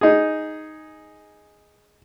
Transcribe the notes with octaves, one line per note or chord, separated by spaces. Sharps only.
D#4 G#4